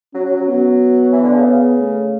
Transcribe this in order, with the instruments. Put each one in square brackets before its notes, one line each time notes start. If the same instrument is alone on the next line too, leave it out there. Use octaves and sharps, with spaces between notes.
[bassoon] F#3 [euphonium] C#4
[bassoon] F#3
F#3
[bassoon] F#3 [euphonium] B3
[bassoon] E3
D3
C#3
C#3
[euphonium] A3